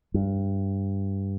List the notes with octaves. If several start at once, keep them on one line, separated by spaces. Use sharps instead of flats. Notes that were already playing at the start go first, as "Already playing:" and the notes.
G2